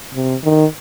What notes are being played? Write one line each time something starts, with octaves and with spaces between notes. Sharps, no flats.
C3
D#3